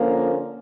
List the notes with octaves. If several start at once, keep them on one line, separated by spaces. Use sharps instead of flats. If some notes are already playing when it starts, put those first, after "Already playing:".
Already playing: D3 F3 A#3 C#4